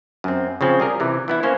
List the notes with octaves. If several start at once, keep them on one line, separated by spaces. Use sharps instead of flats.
F#2 C4
C#3 F3 C4 C#4
G3 G#4 A#4
C3 E3
E3 B3 E4
A#3 C#4 C5 C#5